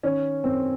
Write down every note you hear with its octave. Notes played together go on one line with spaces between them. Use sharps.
D#3 C#4
F#2 C4